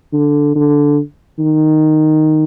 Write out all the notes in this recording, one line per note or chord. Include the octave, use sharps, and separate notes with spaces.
D3
D3
D#3